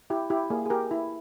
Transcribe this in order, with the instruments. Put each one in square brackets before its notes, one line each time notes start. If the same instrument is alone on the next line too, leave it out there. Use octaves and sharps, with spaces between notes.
[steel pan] E4 G4
E4 G4
A#3 G#4
G#4
G4 A#4
E4